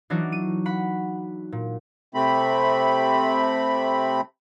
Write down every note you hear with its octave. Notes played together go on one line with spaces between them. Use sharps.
E3 F#3 D4 D#4 F#4
D#7
F#5 B5
A#2
C3 A3 C4 B5